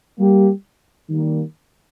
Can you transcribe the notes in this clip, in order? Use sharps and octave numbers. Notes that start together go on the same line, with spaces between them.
G3 A#3 G4
D#3 G3 A#3